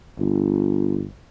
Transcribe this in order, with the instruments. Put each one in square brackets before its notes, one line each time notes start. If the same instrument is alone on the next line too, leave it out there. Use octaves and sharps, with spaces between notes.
[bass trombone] G1